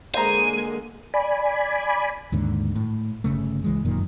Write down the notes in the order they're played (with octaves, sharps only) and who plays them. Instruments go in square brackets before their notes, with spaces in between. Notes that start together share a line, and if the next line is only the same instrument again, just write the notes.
[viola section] D3 G#3 A#3 [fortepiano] C5 A#5 [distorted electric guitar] G#5 [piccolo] D#7
[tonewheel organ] D5 G#5 B5
[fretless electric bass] D#2 G#2 D3
A2
G1 C#2 C#3 A3
C#2 E3 G#3
G1 F#2 A#2 D#3